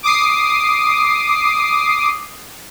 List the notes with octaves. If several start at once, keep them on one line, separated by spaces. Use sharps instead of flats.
D6 D#6 C7